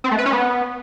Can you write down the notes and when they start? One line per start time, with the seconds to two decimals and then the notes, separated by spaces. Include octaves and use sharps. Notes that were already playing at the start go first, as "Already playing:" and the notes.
0.04 C4
0.11 A3
0.18 B4
0.26 C#4
0.33 B3